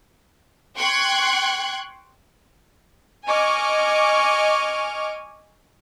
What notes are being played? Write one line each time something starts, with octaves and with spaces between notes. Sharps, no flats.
G5 C6 C#6 F#6 G#6
D#5 G#5 C#6 D6 F6